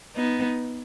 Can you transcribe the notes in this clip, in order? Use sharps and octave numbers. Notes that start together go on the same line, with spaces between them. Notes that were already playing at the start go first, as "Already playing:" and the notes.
B3 D#4